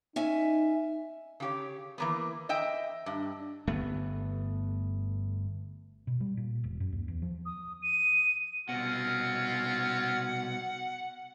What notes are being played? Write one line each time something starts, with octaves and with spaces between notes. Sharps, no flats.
C#4 D#4 E5 G#5
C#3 G4 C#5
E3 A#3 B3
D#5 E5 G5
G2
G1 A3 B3
B2
G3
A#2
E1
F#2
D#2
E2
F3
D#6
D#7
C2 B2 C4 C#4 F4 F#5